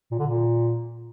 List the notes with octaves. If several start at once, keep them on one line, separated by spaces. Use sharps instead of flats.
A#2
D3
A#2